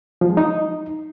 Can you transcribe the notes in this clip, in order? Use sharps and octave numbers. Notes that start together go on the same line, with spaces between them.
F3
G#3
D#4